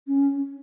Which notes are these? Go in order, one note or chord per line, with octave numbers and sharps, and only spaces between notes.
C#4